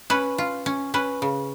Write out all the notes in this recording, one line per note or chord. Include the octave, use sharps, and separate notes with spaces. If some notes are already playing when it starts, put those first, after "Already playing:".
C#4 B4
F4
C#4
C#4 B4
C#3